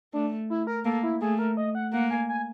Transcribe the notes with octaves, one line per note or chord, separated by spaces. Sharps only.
A3 D4
E4
A#4
A#3 A4
E4
A3 G#4
A#4
D#5
F#5
A#3 F#5
G#5
G#5